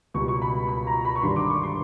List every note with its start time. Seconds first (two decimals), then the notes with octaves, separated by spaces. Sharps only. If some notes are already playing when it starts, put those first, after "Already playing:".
0.14 C#2 B2 G3 C#6
0.28 C#6
0.42 B5
0.69 B5
0.87 A#5
1.05 B5
1.16 C#6
1.23 G#1 G2 D3 G3 C6
1.36 D6
1.50 C#6
1.63 C6